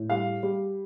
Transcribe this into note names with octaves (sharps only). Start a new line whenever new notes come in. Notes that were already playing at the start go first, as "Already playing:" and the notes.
Already playing: A2
G3 F5
G3